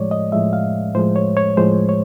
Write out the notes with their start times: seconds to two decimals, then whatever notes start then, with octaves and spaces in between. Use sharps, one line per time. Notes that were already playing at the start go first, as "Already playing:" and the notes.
Already playing: A2 F3 G#3 C#5 D5
0.11 D#5
0.32 A2 F3 G#3 E5
0.53 F5
0.95 A2 F3 G#3 C5
1.16 C#5
1.37 C#5
1.57 A2 F3 G#3 C5
1.89 C#5